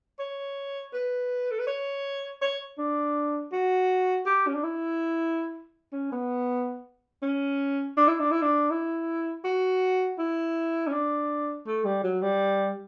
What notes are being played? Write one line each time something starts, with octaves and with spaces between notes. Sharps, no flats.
C#5
B4
A4
B4
C#5
C#5
D4
F#4
G4
C#4
D4
E4
C#4
B3
C#4
D4
E4
D4
E4
D4
E4
F#4
E4
C#4
D4
A3
G3
F#3
G3